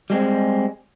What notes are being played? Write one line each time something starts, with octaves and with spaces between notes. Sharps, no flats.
G3 G#3 C4